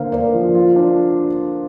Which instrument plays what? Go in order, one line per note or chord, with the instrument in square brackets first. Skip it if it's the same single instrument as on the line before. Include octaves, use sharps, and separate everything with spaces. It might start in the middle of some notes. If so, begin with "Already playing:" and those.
Already playing: [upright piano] D3 A#3 [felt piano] C5 F5
[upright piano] D3 [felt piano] A#4 D5
[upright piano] F3
F4
D4